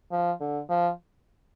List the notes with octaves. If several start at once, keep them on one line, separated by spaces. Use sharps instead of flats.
F3
D3
F3